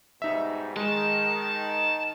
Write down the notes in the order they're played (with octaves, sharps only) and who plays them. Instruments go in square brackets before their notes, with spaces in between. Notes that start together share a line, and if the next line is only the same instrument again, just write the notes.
[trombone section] G#2 B2 G3 [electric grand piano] D#4 E5
[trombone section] D#3 [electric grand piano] G#3 [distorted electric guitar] A5